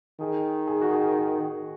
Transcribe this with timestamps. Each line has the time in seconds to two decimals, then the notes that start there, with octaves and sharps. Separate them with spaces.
0.20 D#3 G#4
0.68 G#4
0.81 F#4
0.92 G#4